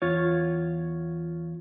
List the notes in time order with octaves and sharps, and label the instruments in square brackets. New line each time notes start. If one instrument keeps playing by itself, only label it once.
[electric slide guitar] E2 F4 C#5